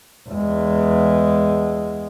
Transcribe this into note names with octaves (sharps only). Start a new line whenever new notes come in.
E2 G#3